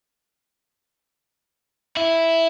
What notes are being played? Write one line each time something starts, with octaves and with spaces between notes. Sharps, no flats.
E4